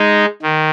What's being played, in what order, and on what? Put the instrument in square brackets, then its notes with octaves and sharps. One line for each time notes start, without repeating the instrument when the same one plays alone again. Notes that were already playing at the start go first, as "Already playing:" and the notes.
Already playing: [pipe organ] G#3 D#4
D#3